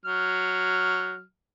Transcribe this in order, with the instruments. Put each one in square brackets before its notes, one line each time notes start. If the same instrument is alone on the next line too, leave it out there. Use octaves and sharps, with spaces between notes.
[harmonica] F#3 F6